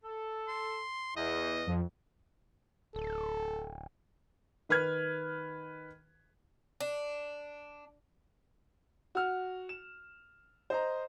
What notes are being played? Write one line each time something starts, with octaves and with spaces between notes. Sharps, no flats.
A4
C6
E2 D#5
F2
D1 A4
D#3 B4 F6 G#6
D4
F#4 F6
E7
C5 D#5 A#5